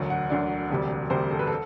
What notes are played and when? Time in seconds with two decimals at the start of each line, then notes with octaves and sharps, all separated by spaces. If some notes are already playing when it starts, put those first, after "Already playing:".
Already playing: E1 D2 D3 F#3 F#5
0.10 F#5
0.29 E1 D2 D3 F#3 D5
0.70 E1 D2 C3 G3
1.10 E1 D2 C3 G3 C5
1.31 A4
1.39 B4
1.47 A4